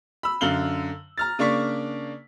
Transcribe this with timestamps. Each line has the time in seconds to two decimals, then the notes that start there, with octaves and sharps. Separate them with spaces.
0.23 B5 E6
0.41 F#2 D3 F5 F#7 G7
1.18 A#5 F6 A6
1.39 C#3 A#3 D4 D5 C#6 B6